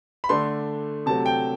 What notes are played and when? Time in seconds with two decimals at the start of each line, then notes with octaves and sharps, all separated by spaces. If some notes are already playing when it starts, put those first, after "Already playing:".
0.24 B5
0.29 D3 A3 D4 C6
1.06 C3 F#3 A3 A5
1.26 G5